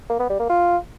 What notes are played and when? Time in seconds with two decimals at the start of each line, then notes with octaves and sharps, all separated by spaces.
0.10 A#3
0.20 B3
0.30 G3
0.39 A#3
0.49 F4